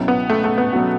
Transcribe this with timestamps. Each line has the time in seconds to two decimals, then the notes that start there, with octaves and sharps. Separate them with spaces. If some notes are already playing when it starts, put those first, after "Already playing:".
Already playing: C#2 B2 F#3 C#4 E4
0.08 B3
0.29 A3
0.44 A3
0.58 B3
0.72 B2 F#3 C#4 F#4